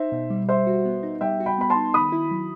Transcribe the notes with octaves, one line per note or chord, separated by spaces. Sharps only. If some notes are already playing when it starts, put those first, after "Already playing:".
Already playing: D#4 C5 E5
B2
G3
G3 C5 E5
F#4
B3
D#4
G3 E5 G5
F#4
G5 B5
B3 B5
A5 C6
D#4
D#3 B5 D#6
E4
F#3